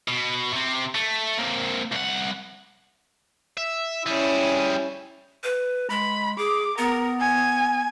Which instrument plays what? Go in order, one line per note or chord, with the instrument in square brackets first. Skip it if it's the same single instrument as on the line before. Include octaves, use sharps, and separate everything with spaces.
[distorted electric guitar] B2
C3 C4
A3
A#3 C4
C2 F#5
[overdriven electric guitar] E5
[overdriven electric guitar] G3 G#4 [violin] C#4 E4
[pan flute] B4
[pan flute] G#3 [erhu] B5
[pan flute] G#4 [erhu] D6
[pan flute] B3 [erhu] A#4
[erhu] G#5